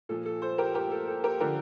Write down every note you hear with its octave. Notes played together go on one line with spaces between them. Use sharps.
A#2 F3 A4
A4
A4 C5
G4 A#4
G4 A#4
A4
A4
G4 A#4
D3 F3 G4 A#4